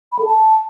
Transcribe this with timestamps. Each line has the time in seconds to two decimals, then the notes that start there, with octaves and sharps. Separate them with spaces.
0.12 B5
0.19 A4
0.25 A5